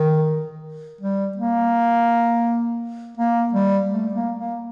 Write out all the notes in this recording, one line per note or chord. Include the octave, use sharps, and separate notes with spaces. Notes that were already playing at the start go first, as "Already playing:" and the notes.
Already playing: D#3
G3
A#3
A#3
G3
A3
A#3
A#3